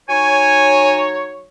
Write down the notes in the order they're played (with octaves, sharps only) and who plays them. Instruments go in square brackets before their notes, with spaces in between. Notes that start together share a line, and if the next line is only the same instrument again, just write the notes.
[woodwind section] F#3 D#4 C#5 [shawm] G#5